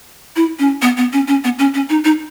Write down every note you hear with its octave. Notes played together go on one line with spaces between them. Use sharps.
E4
C#4
B3
B3
C#4
C#4
B3
C#4
C#4
D#4
D#4